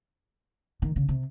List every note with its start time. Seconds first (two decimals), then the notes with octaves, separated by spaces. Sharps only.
0.82 D#3
0.96 C#3
1.09 C3